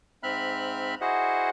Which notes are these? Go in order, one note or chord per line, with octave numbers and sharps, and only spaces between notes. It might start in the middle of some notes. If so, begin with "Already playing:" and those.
G#2 C4 E5 B5 F6 F#6
E4 F#4 G#4 C5 D#5 F#5